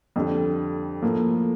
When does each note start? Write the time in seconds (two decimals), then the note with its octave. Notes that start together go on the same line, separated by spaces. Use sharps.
0.16 F2 D3 G3
1.02 A2 F3 A#3